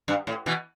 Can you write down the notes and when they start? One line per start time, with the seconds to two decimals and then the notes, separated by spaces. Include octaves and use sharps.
0.08 G2
0.27 A2
0.46 B2 E3